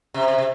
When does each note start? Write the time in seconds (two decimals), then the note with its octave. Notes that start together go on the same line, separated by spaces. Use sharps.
0.14 C3
0.28 C3
0.38 C3